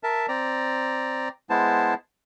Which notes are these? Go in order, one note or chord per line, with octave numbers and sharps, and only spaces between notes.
A#4 E5 A5
C4 D5 A#5
G#3 B3 E4 C5 A5